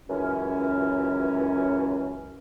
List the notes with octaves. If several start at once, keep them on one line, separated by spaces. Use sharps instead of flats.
C#2 F#2 E3 C#4